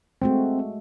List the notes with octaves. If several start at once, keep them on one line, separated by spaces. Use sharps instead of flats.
G#3 A3 C4 F#4